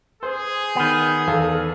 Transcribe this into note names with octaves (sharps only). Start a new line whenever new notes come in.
G#4 C5
D#3 B3
E2 A4 F5